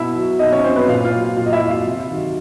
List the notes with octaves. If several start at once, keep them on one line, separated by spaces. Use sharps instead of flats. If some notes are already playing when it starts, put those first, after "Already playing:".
Already playing: B2 E4 E5
F#3
B2 D#4 D#5
C#4 C#5
F#3 C4 C5
B3 B4
A#2 F4 F5
F4 F5
F#3
A#2 F4 F5
D#5
E4 E5
F#3
F4 F5
C3
D#3 F#3